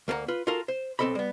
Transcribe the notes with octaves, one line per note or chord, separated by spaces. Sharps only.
D2 A#3 A#4 F#5 A#5
F4 B4
F4 F#4 A4 A#4 F5
C5
B1 C4 A4 D#5 B5
G3 B3